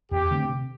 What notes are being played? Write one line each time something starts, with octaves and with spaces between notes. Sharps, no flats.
E2 G4
D3 A3 C4
C3